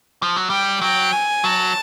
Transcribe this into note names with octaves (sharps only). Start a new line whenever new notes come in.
F3
F#3
G3 G5
F#3 G5
G#5
F#3 A5